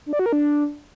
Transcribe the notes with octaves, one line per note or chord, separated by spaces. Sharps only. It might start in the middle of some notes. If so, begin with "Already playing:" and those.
D4
D5
F#4
A#4
D4